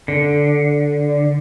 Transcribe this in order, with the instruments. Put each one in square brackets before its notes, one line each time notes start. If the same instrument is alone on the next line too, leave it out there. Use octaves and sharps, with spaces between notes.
[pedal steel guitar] D3